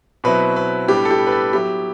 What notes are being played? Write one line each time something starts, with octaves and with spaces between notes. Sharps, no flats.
B2 F#3 C4 E4 B4
B4
A2 G3 B3 D4 G4
A4
G4
B4
A4
F#3 B3 E4 G4